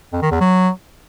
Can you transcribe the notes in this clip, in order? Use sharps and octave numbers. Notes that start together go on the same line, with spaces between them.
F2
D#3
E2
F#3